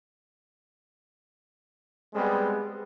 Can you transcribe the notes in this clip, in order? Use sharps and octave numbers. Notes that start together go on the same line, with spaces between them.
G3 G#3 B3 C4 G#4